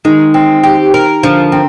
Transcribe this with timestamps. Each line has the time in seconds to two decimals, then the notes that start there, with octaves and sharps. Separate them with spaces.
0.05 D#3 G#3
0.34 C4
0.63 G4
0.94 A#4
1.23 D3 F3
1.52 D3 C4